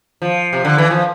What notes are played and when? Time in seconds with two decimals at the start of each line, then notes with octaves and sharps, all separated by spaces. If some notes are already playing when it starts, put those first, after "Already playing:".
0.22 F3
0.53 C3
0.65 D3
0.78 E3
0.91 F3